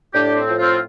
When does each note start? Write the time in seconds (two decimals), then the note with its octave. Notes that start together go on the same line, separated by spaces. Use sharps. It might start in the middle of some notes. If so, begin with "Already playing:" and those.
0.14 A2 D4 G4
0.36 C4
0.48 F3
0.58 C4 F4